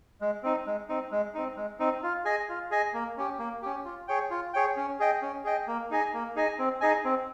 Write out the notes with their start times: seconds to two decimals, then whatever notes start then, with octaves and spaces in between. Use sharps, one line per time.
0.21 G#3
0.43 C4 D#4
0.67 G#3
0.89 C4 D#4
1.12 G#3
1.35 C4 D#4
1.57 G#3
1.79 C4 D#4
2.03 F4
2.25 G#4 D#5 G#5
2.49 F4
2.71 G#4 D#5 G#5
2.94 A#3
3.17 C#4 G4
3.39 A#3
3.62 C#4 G4
3.85 F4
4.08 G#4 C#5 G5
4.30 F4
4.54 G#4 C#5 G5
4.77 C#4
5.00 G#4 D#5 G5
5.22 C#4
5.44 G#4 D#5 G5
5.68 A#3
5.91 D#4 G#4 D#5 G#5
6.14 A#3
6.36 D#4 G#4 D#5 G#5
6.59 C4
6.81 D#4 G#4 D#5 G#5
7.05 C4